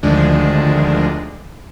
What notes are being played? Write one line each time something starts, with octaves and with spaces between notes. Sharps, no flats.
D2 D3 D#3 F3 G#3 D4